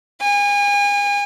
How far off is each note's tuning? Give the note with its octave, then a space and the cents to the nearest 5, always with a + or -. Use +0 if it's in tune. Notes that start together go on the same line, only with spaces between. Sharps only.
G#5 -35